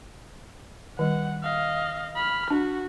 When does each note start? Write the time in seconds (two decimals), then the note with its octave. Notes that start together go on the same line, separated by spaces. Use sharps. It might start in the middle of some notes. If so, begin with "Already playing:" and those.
0.99 D#3 G3 F#5
1.43 D#5 F5
2.16 B5 F6
2.50 D4 F#4